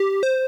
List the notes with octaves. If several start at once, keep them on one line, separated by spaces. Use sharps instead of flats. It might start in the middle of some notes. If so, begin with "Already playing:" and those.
Already playing: G4
C5